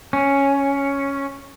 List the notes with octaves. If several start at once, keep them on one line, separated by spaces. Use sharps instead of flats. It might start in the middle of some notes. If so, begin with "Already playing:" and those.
C#4